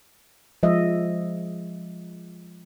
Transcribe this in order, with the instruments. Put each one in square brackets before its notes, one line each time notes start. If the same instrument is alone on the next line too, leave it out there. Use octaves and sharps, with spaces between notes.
[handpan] F3 G#3 D#5 E5